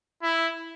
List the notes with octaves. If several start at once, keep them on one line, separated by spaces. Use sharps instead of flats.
E4